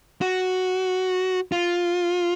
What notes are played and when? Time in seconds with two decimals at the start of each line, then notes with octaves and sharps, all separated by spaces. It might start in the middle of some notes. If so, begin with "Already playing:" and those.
0.21 F#4
1.52 F4